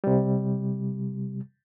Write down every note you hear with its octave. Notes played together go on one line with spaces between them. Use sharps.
C3 G3